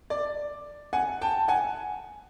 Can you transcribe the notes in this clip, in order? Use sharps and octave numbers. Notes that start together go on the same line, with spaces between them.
D5
F#5 G#5
G5 A5
F#5 G#5